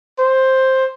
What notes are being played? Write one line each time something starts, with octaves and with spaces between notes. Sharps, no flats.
C5